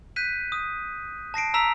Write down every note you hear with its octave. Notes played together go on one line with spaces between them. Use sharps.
F#6 G6 B6 D#7
D#6
A5 A#6 C7 D7
A#5 E6 B6 E7 F7